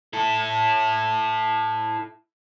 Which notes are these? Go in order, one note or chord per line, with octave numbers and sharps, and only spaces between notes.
E4 A4